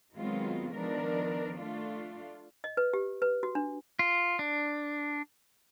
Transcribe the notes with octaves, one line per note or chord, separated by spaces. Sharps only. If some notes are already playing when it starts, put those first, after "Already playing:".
D#3 F#3 G#3 B3 C4 F4
D#3 F3 B3 D4 A#4
A3 D4 F4
D#5
B4
G4
B4
F#4
D4
F4
D4